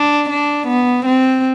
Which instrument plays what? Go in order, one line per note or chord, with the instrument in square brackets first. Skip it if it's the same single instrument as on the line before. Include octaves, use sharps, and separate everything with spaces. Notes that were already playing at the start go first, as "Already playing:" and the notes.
Already playing: [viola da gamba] D4
D4
B3
C4